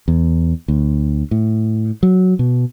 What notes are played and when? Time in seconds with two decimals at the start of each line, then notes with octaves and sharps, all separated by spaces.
0.08 E2
0.68 D2
1.31 A2
2.03 F#3
2.39 B2